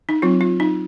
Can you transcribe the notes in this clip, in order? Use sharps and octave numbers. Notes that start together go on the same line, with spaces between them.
D#4
F#3 C4 F4
F4
D#4